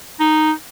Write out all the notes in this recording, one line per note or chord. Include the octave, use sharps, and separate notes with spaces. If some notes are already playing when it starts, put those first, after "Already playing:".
D#4